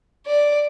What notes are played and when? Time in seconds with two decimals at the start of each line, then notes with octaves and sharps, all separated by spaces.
0.26 D5